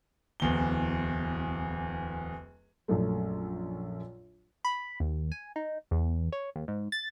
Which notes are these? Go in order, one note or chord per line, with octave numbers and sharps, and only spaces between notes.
D1 E2 G7
A#1 F#2 A3
B5
D#2
G#5
D#4
E2
C#5
D#2
G#2
A6